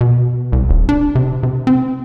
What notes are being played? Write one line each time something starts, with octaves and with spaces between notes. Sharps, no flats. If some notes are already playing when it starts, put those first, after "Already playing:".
B2
C2
D#1
D4
C3
C3
C4